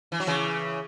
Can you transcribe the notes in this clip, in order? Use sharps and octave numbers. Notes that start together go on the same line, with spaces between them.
E3
F#3
C#3 E3